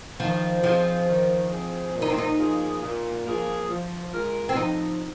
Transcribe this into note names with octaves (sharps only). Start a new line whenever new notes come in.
D#3 F3
F3 C4 D#4 G#4
D#3
C4 D#4 G#4
A#2
D#4
C4
D#4
F3 A#3 G#4
A#2
F3 A#3 G#4
F3
G#3 F4 A#4
C4
F3 D#4